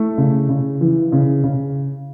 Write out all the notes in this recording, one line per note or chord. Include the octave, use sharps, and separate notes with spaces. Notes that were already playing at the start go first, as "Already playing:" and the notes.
Already playing: A3 E4
C#3
C#3
E3
C#3
C#3